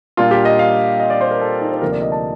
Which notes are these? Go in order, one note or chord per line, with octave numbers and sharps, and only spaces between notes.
A#2 G3 A#3 D4 F4
G4
D#5
F5
D#5
D5
C5
A#4
A4
D#4
C5
D2 C3 F3 A#3 A#4
D5
D#5
A5